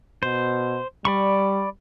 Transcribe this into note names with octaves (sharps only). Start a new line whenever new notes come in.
B2 C5
G3 D5 B5 C#6